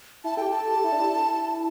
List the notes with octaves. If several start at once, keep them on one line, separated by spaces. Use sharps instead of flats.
E4 A5
G4 A4 G5
A5
A4
G4
E4
D4
E4